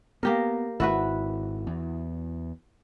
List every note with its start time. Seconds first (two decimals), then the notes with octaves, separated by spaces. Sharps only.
0.23 A#3 B3 G4 A#4
0.80 G#1 E4 F#4 B4
1.67 E2